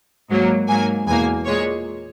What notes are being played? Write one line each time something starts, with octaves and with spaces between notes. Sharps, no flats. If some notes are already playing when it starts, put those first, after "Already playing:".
G#2 F#3 A#3
G#2 F#3 A#3 G#5
E2 B2 A#3 G#5
A#2 G#3 C#5